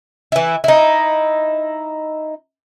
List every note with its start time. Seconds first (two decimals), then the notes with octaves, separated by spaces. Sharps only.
0.32 E3 E4
0.64 D#4 E4